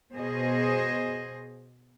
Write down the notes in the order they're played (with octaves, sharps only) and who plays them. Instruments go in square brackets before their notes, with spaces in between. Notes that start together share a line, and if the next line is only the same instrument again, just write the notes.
[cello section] B2 G#4 C5 D#5